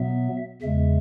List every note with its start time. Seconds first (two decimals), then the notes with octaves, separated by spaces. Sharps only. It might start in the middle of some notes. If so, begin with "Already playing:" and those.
Already playing: B2 F#3 B3 E5
0.62 E2 C#3 G#3 E5